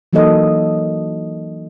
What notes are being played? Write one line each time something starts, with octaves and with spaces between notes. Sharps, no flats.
E3 F#3 A#3 D#4 A4 D#5